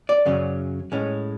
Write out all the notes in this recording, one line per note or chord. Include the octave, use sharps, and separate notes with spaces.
D5
F#2 C#3 F#3 C#4
A2 G#3 C#4